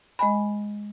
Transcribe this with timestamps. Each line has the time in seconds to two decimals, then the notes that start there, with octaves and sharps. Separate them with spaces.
0.19 G#3 D#5 G#5 B5